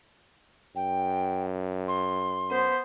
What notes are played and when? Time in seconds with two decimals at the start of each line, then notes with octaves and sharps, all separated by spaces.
0.76 F#2 G5
1.88 C6
2.51 B3 C5